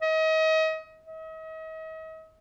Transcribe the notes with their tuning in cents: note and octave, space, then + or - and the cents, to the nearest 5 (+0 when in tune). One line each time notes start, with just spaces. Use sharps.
D#5 +35
D#5 +40